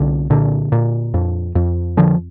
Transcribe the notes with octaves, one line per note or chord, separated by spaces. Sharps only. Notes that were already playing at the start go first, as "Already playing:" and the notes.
Already playing: C2 D3
A#2 D3
A#2
F2
F2
D3 F3